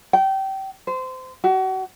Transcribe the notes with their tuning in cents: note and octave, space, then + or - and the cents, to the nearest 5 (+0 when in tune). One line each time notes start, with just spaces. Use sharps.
G5 -25
C5 -25
F#4 +35